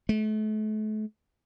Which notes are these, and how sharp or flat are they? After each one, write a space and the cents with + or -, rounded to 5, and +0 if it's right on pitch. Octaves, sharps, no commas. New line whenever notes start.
A3 -40